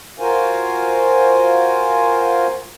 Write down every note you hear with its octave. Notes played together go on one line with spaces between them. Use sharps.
F4 F#4 A#4 C5 F5 G#5